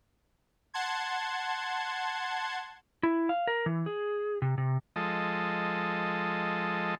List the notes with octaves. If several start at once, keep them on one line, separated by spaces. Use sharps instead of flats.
F#5 A5 C6 G#6
E4
F5
A#4
E3
G#4
C3
C3
F3 G#3 A4 D#5